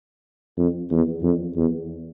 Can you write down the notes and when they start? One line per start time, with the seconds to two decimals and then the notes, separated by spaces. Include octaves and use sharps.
0.58 F2
0.91 E2
1.23 F2
1.56 E2